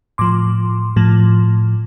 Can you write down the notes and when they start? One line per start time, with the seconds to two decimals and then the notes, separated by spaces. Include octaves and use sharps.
0.18 A2 F3 C6 D6
0.96 A2 F3